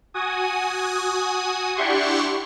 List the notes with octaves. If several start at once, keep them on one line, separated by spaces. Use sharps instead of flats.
F#4 G#5 D#6
D4 E4 G4 F#5 C6 C#6